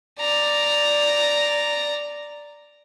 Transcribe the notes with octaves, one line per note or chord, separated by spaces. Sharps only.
D5 A#5